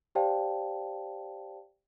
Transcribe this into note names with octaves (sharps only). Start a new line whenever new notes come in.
G4 C5 D5 F5 G5 A5